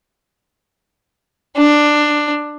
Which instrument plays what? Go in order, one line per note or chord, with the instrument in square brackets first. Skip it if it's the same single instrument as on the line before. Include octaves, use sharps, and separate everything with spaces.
[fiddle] D4